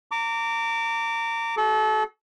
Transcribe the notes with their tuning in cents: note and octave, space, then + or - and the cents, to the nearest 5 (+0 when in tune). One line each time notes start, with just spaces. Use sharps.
A#5 -30 D6 -15
F#4 +30 A4 -30